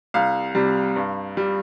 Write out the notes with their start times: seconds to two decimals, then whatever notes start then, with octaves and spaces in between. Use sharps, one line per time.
0.14 C2 F5
0.55 C3 G3
0.96 G2
1.37 G3